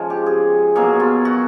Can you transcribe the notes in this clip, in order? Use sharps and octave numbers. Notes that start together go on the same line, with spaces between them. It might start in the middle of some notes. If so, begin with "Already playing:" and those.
Already playing: C#3 F3 G#3 F4
G4
G#4
B2 F#3 A#3 G#4
F4
F#4